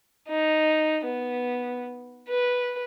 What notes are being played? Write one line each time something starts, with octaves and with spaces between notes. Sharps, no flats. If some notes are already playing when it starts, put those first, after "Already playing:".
D#4
B3
B4